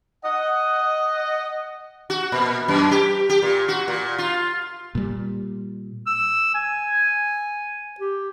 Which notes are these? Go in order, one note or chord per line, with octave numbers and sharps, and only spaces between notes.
D#5 F#5
F#4
A#2
F#2
G4
G4
A#2
F#4
A#2
F4
A#2 G3
E6
G#5
G4